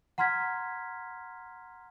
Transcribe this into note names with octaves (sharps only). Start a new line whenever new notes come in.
F#5 A#5 C6 F6 G#6 B6